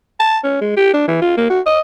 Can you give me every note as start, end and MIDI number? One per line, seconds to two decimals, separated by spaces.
0.20 0.38 81
0.44 0.56 61
0.61 0.75 56
0.77 0.93 67
0.94 1.06 62
1.08 1.20 52
1.22 1.35 65
1.37 1.47 58
1.50 1.61 66
1.66 1.80 75